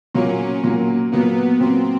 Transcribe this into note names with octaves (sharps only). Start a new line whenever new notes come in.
A#2 F#3 A#3 C#4
A#2 F#3 A#3
A#2 F#3 A#3 B3
A#2 F#3 A#3 C4